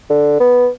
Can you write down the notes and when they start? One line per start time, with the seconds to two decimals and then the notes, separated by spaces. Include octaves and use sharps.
0.10 D3
0.40 B3